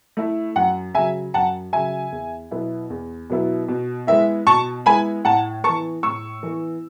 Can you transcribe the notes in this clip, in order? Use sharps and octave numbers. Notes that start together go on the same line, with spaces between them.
A3 E4
F#2 F#5
C#3 F#3 E5 G#5
F#2 F#5 A5
C#3 F#3 E5 G#5
E2
B2 F#3 B3 E4
E2
B2 F#3 B3 E4
B2
G#3 B3 E4 E5
B2 A5 C#6
G#3 B3 E4 G#5 B5
A2 F#5 A5
E3 B3 A5 C#6
A2 C#6 E6
E3 B3